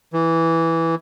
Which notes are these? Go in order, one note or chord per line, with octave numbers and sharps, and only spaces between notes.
E3